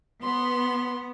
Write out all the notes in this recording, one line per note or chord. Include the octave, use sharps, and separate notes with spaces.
B3 C6